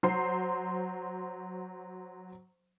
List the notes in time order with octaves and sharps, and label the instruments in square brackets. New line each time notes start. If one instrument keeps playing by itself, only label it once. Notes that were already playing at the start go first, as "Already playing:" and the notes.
[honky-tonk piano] F#3 C5 C6 C7